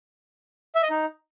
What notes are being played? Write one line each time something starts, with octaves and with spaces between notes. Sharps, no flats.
E5
D#5
D#4